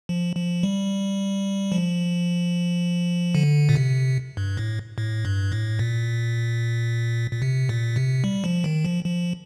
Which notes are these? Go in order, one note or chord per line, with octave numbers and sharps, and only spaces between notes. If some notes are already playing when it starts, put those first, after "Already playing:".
F3
F3
G3
F3
D3
A#2
C3
G2
A2
A2
G2
A2
A#2
A#2
C3
A#2
C3
G3
F3
D#3
F3
F3